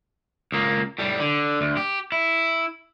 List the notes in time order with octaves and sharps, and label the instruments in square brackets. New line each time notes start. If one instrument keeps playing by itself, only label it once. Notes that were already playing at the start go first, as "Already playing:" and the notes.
[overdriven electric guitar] C#2 A#3
A2 G3
D3
D2
G4
E4